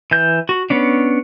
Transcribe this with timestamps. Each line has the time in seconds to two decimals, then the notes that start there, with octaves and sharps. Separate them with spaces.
0.11 E3 G6
0.49 F#4
0.70 B3 C#4 D4